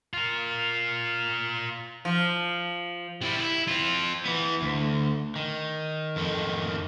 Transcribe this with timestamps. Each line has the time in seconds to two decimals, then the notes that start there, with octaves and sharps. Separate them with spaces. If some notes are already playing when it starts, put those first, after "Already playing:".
0.14 F4 A#4
2.05 F3
3.22 G3 E4
3.40 E4
3.68 C4 F4
4.25 E3 B3
4.62 D2
5.36 D#3
6.16 F2 D#3